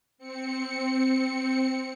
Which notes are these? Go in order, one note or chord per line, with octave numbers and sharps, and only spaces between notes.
C4 C#7